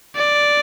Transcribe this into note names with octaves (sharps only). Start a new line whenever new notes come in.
D5